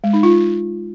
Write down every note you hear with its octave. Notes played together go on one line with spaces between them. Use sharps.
G#3
D#4
F4